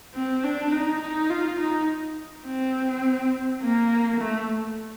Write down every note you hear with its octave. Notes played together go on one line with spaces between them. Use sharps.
C4
D4
D#4
D#4
F4
D#4
C4
A#3
A3